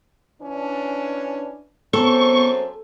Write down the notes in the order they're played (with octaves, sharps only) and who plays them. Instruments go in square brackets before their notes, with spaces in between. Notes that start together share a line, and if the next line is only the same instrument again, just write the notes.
[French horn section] E3 C#4 D4
[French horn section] F#2 C4 C5 [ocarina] B3 [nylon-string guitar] A4 [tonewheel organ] C#6